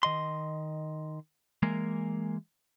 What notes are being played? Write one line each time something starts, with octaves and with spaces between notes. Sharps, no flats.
D#3 D#5 C6
E3 G#3 A#3 A#4